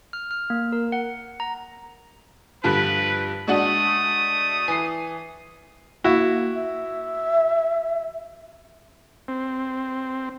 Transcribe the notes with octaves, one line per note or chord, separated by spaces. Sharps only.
F6
F6
A#3
A#4
F#5
A#5
G2 D3 F3 B4
G#3 A3 D4 F#4 D#6
E3 C7
A#3 E4 F#4
E5
C4